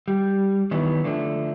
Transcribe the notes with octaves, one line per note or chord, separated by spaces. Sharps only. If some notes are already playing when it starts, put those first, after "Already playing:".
G3
D#3 E3 F#3 B3
D3 F3 A3 D4